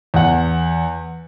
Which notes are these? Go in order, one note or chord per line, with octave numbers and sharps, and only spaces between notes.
E2 F#5